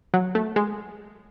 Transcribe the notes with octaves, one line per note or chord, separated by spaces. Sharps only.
F#3
A3
G#3